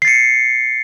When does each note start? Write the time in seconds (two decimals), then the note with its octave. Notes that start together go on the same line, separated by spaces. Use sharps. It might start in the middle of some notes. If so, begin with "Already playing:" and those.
0.02 C7
0.05 A6
0.08 C#7